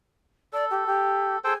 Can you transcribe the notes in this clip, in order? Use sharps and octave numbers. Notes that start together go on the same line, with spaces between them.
A4 D5
G4
G4
G#4 A4 C5 G5